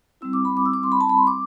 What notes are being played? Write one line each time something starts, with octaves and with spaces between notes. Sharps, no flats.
G3 C4 E4 E6
D6
B5
D6
E6
D6
C6
B5
A5
B5
C6
D6